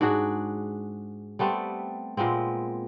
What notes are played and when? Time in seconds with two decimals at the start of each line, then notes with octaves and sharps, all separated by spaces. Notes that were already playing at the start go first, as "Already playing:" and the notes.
0.01 G#2 D4 F#4 G#4
1.39 G3 A3 B3 C4
2.17 A#2 G#3 B3 C4